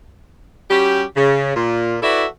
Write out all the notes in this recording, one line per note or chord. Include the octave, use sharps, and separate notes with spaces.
G3 C#4 F#4 G4
C#3
A#2 F4
E4 F#4 A4 B4 D5 E5